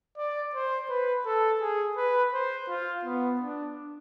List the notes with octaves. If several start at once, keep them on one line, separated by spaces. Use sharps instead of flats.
D5
C5
B4
A4
G#4
B4
C5
F4
B3
D4